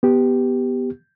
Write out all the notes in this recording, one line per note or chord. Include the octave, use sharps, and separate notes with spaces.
B3 G4